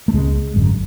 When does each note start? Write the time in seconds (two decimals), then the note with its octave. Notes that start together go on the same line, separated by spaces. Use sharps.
0.08 A3
0.13 C#2 C#3 G#3
0.54 G#1 F#2 D3